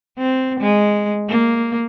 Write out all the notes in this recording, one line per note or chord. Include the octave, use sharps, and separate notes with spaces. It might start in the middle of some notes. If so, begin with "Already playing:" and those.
C4
G#3
A#3